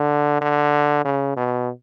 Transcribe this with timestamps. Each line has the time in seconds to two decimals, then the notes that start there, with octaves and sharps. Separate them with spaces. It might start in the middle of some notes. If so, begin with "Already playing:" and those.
Already playing: D3
0.41 D3
1.05 C#3
1.36 B2